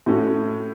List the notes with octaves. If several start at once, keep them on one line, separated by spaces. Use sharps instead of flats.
A2 A3 C#4 F#4